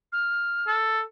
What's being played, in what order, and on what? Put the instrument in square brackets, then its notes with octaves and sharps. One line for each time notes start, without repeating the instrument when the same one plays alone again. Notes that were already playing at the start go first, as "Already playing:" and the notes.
[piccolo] F6
[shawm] A4